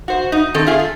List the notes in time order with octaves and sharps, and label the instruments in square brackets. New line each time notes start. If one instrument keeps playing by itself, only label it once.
[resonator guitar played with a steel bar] F#4 C5
D#4
D#3 C4 A4
A3 F4 G#4
A4